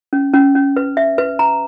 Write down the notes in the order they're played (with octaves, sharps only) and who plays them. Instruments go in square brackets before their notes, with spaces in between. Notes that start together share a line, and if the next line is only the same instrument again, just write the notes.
[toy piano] C#4
C#4
C#4
B4
E5
B4
A#5